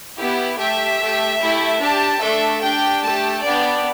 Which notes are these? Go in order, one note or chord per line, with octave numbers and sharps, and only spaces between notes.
B3 E4 G4
A3 G4 E5
A3 G4
A3 E4 G4
D4 G4 A5
A3 D4 A4 E5
D4 G4 G5
A3 G4 A5
B3 D4 G4 D5